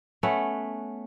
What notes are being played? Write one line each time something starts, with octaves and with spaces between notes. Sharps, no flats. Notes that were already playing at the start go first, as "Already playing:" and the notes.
A3 B3 C#4 F#5